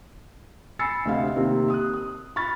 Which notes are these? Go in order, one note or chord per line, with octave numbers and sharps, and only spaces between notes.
G#5 B5 E6 A6 C7 C#7
D2 C3 C4 D#5 F5
C3 D#3 A#3 C4
D#6 F#6
D#6
B5 C#6 F6 A6